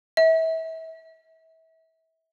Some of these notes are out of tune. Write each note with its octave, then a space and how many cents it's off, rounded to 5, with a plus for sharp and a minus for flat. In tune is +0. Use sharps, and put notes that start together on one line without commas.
E5 -30